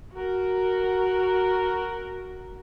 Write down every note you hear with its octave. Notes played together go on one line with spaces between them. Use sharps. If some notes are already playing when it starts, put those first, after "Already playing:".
F#4 A#4